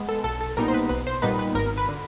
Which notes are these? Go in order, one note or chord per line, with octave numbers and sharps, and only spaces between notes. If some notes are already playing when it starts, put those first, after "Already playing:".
Already playing: G#3 B3
A4
B1 A4
A4
A#2 G3 B3 D#4 A#4
C5
B4
B1 B4
C5
A#2 G3 B3 D#4 B4
B4
G#1 A#4
B4
D3